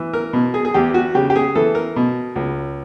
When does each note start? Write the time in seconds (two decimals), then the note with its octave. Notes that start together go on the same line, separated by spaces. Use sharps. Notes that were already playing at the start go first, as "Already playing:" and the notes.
Already playing: E3
0.13 A#4
0.33 B2
0.54 G#4
0.65 G#4
0.74 E2 G4
0.94 F#4
1.14 C#3 G4
1.30 G4
1.36 G#4
1.55 E3 A4
1.75 A#4
1.96 B2
2.36 C#2